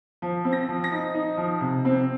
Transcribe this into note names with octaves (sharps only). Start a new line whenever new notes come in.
F3
C4
A#6
F3
A#6
D#4
D#4
F3
C3
C4